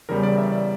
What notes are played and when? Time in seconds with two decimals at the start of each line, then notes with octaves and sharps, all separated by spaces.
0.09 E2 C#3 G3 A#4
0.23 D5
0.38 E5
0.52 D5